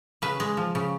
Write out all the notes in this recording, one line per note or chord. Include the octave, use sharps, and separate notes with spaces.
C#3 B4
G#3
F3
C#3